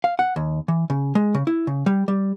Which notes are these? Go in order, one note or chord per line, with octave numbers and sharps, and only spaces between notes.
F5
F#5
D#2
E3
C#3
G#3
C#3
E4
C#3
G3
G3